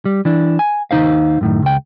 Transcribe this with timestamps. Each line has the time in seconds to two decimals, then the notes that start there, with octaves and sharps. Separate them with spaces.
0.05 G3
0.25 E3 D4
0.59 G#5
0.91 D#2 G#2 D#4 C5 F5
1.41 F#2 A2 D#3
1.62 C#2 G5